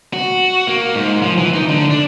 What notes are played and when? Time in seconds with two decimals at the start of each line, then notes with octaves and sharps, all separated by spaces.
0.14 F#4
0.67 A#3
0.95 G#2
1.22 F3
1.38 E3
1.55 D#4
1.69 D3
1.90 D4